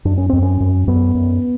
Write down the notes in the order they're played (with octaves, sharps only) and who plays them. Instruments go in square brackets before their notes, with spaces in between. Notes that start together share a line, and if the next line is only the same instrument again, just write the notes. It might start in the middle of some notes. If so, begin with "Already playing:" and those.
[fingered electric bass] F#2 D4
C#4
F#2 C4
C#4
F#2
F#2 B3
F#2